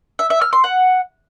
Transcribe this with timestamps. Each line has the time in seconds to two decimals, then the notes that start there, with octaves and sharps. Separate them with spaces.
0.19 E5
0.30 E5
0.41 F6
0.53 C6
0.64 F#5